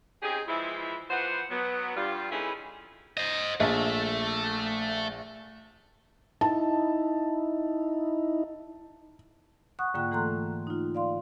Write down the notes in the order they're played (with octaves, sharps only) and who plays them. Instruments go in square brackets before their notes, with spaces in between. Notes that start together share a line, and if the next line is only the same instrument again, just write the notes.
[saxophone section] C4 C#4 D#4 G4 G#4
E3 F3 G#3 E4
E3 F3 B3 C5 F#5
F#3 B3
G2 G3 F4
B3 C#4 D#4 E4 G#4 A4
[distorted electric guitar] C5 D#5
[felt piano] A#1 [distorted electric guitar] A3
[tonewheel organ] D#4 E4 [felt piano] A5
[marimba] F#5 C#6 D#6 F#6
G#2 D3 A#3 F4 G5 F#6
E3 A3 A4 A#5 C6 F#6
D#4 F4
D5 F5 C6